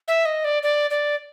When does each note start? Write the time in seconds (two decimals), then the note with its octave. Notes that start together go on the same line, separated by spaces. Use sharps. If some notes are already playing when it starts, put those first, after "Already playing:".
0.08 E5
0.25 D#5
0.45 D5
0.63 D5
0.90 D5